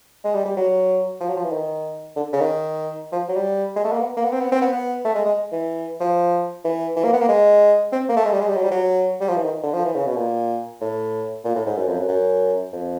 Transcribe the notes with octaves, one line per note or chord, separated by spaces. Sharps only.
G#3
G3
G3
F#3
F3
F#3
F3
E3
D#3
D3
C#3
D#3
F3
F#3
G3
G#3
A3
A#3
B3
A#3
B3
C4
B3
C4
B3
B3
A3
G#3
G#3
E3
F3
E3
E3
A#3
B3
A#3
G#3
C4
A#3
A3
G#3
G3
G#3
G3
F#3
G3
F#3
G3
F3
E3
D#3
D3
F3
E3
C#3
B2
A#2
A2
A#2
A2
G#2
F#2
F2
F#2
F#2
F2